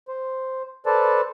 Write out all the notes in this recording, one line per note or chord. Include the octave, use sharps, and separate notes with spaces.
C5
A4 B4 C5 D5 A5